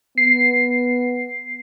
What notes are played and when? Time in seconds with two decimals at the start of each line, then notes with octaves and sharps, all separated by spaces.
0.18 B3 C7